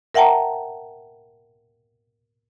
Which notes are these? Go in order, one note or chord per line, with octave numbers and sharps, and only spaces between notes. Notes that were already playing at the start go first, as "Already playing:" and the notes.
A#4 E5 F#5 G5 A5 A#5